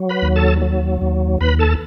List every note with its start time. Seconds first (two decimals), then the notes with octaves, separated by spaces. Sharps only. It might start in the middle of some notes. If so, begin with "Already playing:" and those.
Already playing: F#3
0.09 B4 B5
0.22 D#2
0.36 A4 A5
0.62 F#3
1.01 D#2
1.41 D#2 B4 B5
1.59 A4 A5